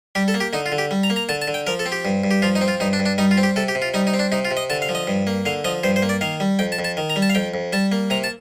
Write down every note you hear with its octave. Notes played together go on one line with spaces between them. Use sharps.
G3 G4
A4
A#3
G4
D3 D#4
F4
D3
G4
G3
A#5
A#3
A#5
D3 A5
A5
D3
G5
F3 A#4
A4
C4
G4
G2
G2
G4
F3 F4
D#4
C4
F4
G2 D#4
D4
G2
D4
G3 D#4
F4
C4
G4
C3 A4
G4
C3
F4
G3 D#4
D#4
C4
D4
C3 D#4
F4
C3
D#5
D3 A5
F5
F3
D#5
G2
A#3
D3 F5
F3 D#5
G2 C5
C5
A#3
D5
D#3 F5
G3
F2 G5
A5
F2
A5
D#3
A#5
G3
A5
F5
F2 G5
F2
G3 A5
A#3
C3 A#5
A5